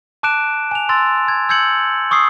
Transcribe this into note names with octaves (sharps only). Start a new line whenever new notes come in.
A5 D6 F#6 D7 E7
G#5 F7
C6 E6 A6
G#6
E6 G6 G#6 C#7 F#7
C#6 D#6 E6 C7